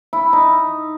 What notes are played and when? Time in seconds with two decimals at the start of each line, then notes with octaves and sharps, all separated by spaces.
0.13 E4
0.33 D#4